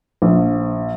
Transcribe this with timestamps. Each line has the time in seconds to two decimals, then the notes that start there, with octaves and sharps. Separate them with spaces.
0.22 A#1